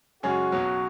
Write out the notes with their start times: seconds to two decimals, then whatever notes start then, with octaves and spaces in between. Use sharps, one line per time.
0.23 F#2 C#3 G#3 C#4 F#4 G#4
0.52 B1 B2 F#3 C#4